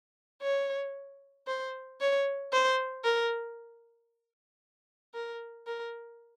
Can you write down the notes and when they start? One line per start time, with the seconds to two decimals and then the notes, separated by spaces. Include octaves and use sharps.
0.42 C#5
1.47 C5
2.01 C#5
2.53 C5
3.04 A#4
5.14 A#4
5.67 A#4